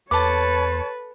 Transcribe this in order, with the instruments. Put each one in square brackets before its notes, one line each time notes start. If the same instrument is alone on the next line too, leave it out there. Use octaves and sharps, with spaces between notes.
[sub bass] E2 [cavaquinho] A4 D6 [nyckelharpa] B4 [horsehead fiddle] C#5 A5